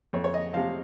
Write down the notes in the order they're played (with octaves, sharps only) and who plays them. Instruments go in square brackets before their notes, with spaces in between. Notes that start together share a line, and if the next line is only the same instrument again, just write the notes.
[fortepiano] F2 C#5
C#5
D#5
C3 F3 F5